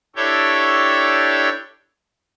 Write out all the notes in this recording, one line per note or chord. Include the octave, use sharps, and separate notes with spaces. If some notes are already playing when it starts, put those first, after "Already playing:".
D4 E4 G4 A4 C#5 G5